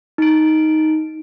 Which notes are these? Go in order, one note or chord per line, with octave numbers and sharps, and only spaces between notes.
D#4 D7